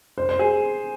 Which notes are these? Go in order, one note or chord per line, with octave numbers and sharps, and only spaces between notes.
C5
C5
G#4